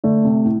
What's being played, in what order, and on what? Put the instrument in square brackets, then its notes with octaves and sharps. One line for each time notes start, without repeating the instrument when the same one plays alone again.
[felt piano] D3 [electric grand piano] A3
[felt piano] C3
A2